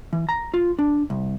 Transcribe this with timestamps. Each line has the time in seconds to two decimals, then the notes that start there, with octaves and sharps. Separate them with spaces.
0.13 E3
0.29 A#5
0.54 F4
0.79 D4
1.10 C2